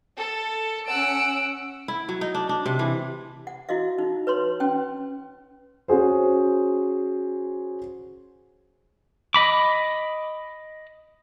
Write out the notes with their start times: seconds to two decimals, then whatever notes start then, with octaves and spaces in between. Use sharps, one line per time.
0.18 A4
0.88 C#4 F#5 E6 D7
1.88 E4
2.09 F#3
2.21 D#4
2.35 D4
2.49 D4
2.66 C3
2.79 E3
3.47 F#5
3.69 E4 F#4 D#5 F5
3.99 D#4
4.27 B4 C#5 C6
4.60 C#4 G5
5.88 C#4 F#4 G#4 C5
9.34 D#5 B5 D6